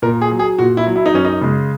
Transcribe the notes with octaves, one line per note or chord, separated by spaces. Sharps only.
A#2 A#4
G#4
F#3
G#4
A#2 F#4
E4
F#3
E4
D#4
F#2 C#4
D#4
C#3 G#3